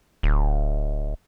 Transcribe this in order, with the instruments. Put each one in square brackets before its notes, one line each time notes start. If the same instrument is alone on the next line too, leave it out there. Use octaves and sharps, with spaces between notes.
[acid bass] D1